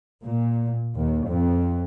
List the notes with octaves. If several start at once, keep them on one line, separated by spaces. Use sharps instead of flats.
A#2
D#2
F2